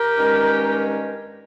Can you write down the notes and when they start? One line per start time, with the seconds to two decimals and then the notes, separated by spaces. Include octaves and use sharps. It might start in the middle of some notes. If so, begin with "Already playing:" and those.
Already playing: G4 A#4
0.17 G2 D#3 G#3 C#4